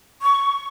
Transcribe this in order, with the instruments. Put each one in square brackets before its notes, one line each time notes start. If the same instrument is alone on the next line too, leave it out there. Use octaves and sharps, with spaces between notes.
[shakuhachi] C#6